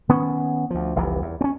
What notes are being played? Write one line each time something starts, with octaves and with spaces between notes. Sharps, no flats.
D#3 B3 C#4
D2 F3
F1 C2 C3 E3
E2
C4 C#4